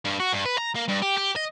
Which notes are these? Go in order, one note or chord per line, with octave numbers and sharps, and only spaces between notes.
G2
F#4
G2
B4
A#5
A#3
G2
G4
G4
D#5